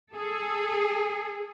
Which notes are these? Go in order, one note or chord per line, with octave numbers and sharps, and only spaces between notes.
G#4 A4